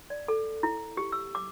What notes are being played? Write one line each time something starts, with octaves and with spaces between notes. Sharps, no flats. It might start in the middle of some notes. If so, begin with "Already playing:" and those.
D5
A4
E4
G4
E6
D6